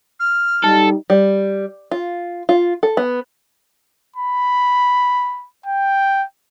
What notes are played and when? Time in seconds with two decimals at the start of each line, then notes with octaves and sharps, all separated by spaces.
0.19 F6
0.64 G3 D#4 A4
1.10 G3
1.91 F4
2.49 F4
2.83 A4
2.97 B3
4.17 B5
5.66 G5